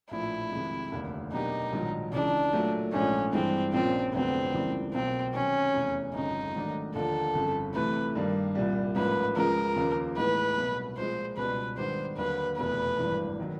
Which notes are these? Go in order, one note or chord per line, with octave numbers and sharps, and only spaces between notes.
A#1 A2 F3 E4
F2 C3 D#3 G#3
F1 D#2 D3
B2 F#3 A#3 D4 D#4 G4
A#1 G#2 D#3 F#3
C#2 C#3 E3 D4
A#2 F#3 A3
A#1 G#2 F3 A3 C#4 D4
G2 E3 G#3 C4
A#1 A#2 F3 A#3 C4 C#4
F1 F2 D3 F#3 B3 C4
C#2 C#3 E3 G3 A#3
B1 B2 F#3 A#3 C4
C3 D#3 F#3 C#4
F1 E2 C3
G1 F2 C#3 D#4
G#2 D#3 F#3 A3 D4
D#2 D3 F3 A#3 A4
G1 F2 C#3
C3 E3 A3 B4
G2 D#3 G3 A#3
C2 A#2 G3
A1 G#2 F3 A#3 B4
C#2 C#3 F3 G#3 A#4
D#2 C#3 F3 A#3
A2 E3 G#3 B3 D#4 B4
C2 B2 F#3
A#2 F3 G#3 C5
C#2 B2 G3 B4
G#2 D#3 G3 B3 D4 C5
D#2 D3 F#3 B4
F1 E2 B2 B4
G#1 G2 E3
D#3 F#3